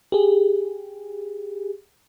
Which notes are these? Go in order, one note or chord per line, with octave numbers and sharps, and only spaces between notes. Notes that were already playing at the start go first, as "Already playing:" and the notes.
G4 G#4